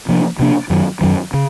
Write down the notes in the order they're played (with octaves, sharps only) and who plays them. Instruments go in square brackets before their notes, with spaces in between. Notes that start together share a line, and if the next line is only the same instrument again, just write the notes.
[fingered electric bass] C3 F3 A#3 D4
C3 F3 A#3 D4
F#2 D#3 F#3
F#2 D#3 F#3
C#3